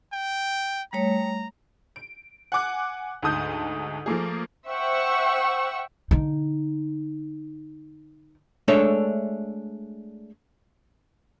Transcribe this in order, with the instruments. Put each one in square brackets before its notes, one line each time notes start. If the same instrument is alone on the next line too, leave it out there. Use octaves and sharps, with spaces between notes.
[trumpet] G5
[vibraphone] G3 A3 C#5 [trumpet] A#5
[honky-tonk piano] D7
F#5 G#5 D6 F#6
D2 G#2 A5 D#6 G6
F3 A3 A#3 G#4
[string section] C5 E5 F#5 G5 C#6 E6
[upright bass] D3 D#4
[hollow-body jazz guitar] G#3 A3 D4 A4 C#5 E5